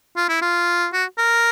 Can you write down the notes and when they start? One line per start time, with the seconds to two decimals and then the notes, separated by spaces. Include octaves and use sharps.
0.17 F4
0.29 E4
0.42 F4
0.93 F#4
1.18 A#4